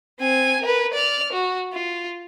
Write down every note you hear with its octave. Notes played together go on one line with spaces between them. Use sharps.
C4 G#5
A#4 B4
D5 F6
F#4
F4